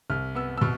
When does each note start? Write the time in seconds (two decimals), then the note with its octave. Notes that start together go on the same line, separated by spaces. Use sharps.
0.10 C2 F6
0.35 B3 E6
0.57 E6
0.61 B2 F6